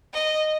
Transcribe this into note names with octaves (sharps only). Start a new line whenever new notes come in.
D#5